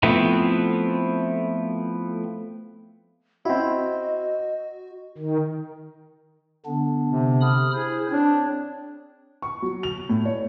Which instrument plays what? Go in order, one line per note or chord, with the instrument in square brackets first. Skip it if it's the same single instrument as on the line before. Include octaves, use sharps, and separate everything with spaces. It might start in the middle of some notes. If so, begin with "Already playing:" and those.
[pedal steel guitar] F3 A3 B3 C4 E4
[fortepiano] C4 E4 [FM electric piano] F#4 [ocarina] D#5
[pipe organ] D#3
D3 B3 D4
[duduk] C3
[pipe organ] B5 D#6 F6
[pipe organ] E4 C5 [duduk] G#4
[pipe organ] C4 C#5 [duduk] D4
[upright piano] C#6
F#3
F7
A2
C#5